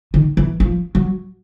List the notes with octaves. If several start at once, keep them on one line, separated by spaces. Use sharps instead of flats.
D#3
E3
F3
F#3